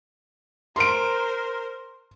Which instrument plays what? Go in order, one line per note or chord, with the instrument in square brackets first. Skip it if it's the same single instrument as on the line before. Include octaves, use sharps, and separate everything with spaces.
[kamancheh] A#4 C5 [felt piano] C6 D7